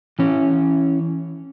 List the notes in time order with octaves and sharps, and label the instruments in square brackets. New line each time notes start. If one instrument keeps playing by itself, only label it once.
[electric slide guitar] E3 C#4